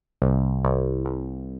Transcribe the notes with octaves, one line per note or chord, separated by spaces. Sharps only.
C2
C2
C2